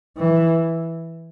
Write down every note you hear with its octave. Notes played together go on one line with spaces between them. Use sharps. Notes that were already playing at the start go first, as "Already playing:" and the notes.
E3